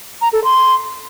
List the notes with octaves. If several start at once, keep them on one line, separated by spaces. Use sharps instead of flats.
A#5
A4
C6